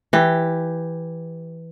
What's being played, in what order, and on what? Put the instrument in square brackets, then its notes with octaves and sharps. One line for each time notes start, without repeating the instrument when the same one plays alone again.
[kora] E3 G4